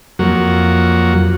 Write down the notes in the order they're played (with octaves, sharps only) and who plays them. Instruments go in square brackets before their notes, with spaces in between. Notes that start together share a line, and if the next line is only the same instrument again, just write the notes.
[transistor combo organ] F2 F#3 A#3 F#4